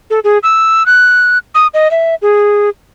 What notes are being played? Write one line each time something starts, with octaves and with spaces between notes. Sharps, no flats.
A4
G#4
E6
F#6
D#6
D#5
E5
G#4